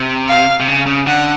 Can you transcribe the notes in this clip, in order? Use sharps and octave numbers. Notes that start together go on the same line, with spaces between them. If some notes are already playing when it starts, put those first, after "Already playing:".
Already playing: C3
F5
C3
C#3
C#3
D3 F#5